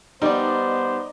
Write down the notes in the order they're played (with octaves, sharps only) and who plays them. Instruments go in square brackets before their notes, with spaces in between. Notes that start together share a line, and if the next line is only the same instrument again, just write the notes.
[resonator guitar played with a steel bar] G3 [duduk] B3 [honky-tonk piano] D#4 D5 [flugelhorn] C5